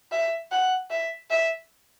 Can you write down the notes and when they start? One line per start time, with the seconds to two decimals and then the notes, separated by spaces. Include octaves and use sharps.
0.12 E5
0.51 F#5
0.90 E5
1.30 E5